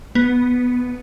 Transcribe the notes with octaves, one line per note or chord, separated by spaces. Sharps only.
B3